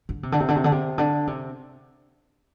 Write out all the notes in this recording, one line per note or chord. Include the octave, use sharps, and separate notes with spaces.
D3
C3
D3
C3
D3
C3
D3
C3
D3
C3